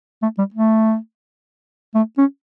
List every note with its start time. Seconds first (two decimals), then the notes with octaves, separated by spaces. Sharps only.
0.23 A3
0.38 G3
0.54 A3
1.95 A3
2.18 C#4